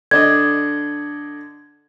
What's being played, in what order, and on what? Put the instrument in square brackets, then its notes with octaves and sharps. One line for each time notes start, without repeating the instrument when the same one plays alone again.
[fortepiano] D3 D4 D#5 [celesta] G#6